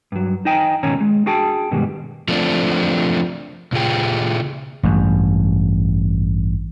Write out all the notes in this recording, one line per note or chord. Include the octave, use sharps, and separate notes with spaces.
G2 F#3
D#4 C5 D#5 G5 G#5 A#5
G#2 B2 D#3 C#4 C#5 A#5
G#3
D4 F#4 G#4 G5 A5
G2 B2 D#3 G3 G#3
F3 A3 C4 D4
A#2 C#3 F4 G#4 G5
A1 G2